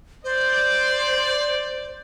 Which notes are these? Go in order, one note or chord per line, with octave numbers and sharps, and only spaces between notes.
C5 D5